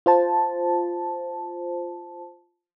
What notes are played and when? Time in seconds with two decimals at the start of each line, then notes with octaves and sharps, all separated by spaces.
0.06 F4 C5 A5